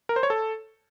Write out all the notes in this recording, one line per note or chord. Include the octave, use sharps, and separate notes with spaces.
A#4
C5
C#5
A4